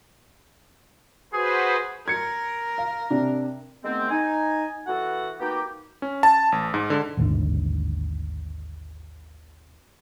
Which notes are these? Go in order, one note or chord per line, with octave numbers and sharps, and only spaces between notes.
F#4 G#4 B4 C5
A#4 G#6 C#7
F5
C3 D4
D#3 G#3 A3 B3 C4
D#4 G#5
E3 B3 F#4 A4 F#5
A#3 B3 D#4 F#4 G4
C#4
A5
A1
G#2
D3
A1 D#2 G#2 D3